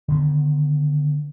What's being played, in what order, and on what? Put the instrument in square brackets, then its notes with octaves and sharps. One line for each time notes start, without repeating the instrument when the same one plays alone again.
[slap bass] D3 D#3 B3